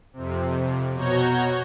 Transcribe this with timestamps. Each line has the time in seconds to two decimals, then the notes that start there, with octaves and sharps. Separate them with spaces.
0.13 F2 C3
0.94 B2 F#4 C#5 A#5 G6 G#6